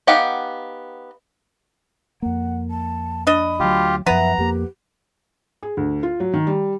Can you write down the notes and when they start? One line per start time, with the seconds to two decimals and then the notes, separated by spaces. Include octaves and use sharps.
0.07 B3 D#4 G4 F5 F#5
2.22 F2 A#3 F#5
2.71 A5
3.27 D4 D#5 B5
3.60 D2 F#3 F4 G4
4.06 F#2 F3 B3 B4 E5 F#5 A#5
4.38 F2 A#3 G4
5.63 G#4
5.77 D2
6.03 F4
6.20 F#3
6.34 D#3
6.47 G3